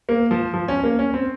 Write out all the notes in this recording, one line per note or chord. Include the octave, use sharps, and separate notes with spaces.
A#3
F3
F3
C#4
A#3
C#4
C4